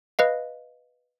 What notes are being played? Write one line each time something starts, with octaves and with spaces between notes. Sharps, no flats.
B4 D#5 F5